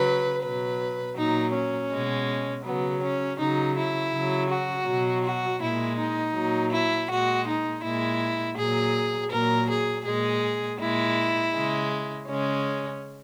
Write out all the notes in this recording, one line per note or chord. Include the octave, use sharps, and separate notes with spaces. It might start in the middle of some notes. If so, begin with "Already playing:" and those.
Already playing: C#3 F#3 B4
B2 F#3 B4
A#2 F#3 D#4
C#4
B2 G#3
C#3 F#3 B3
C#4
C#3 F#3 D#4
E4
C#3 F#3
F#4
B2 F#3
F#4
A#2 G#3 E4
D#4
A#2 F#3
E4
A#2 G#3 F#4
D#4
A#2 G#3 E4
A#2 F#3 G#4
A#2 F#3 A#4
G#4
A#2 G#3 G#4
A#2 G#3 E4
C#3 G#3
C#3 G#3 C#4